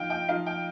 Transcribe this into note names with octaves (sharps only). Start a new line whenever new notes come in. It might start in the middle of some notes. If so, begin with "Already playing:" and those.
Already playing: F3 D#4 F5 G5
G5
F3 D#4 F5
G5